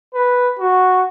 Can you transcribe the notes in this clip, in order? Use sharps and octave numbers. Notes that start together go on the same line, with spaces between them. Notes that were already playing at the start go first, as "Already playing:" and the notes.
B4
F#4